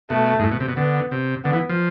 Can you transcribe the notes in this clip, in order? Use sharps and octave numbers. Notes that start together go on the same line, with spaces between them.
B2 A3
G#2
A2
B2
C3
B2
D3 B3
C3
D3 B3
E3
F3